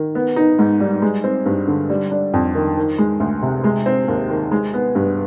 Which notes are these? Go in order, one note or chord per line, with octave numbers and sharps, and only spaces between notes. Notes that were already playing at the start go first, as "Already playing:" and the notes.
Already playing: D#3
B3
D#4
G#2
G3
G#3
C4
G2
D3
G3
D4
F2
D#3
D#3
G#3
D2
C3
G#3
C4
D#2
D#3
G#3
B3
G2